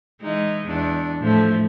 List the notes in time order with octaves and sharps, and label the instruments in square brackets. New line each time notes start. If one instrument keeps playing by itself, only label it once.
[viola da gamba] E3 G#3 D#4
E2 D4
A2 F3 A3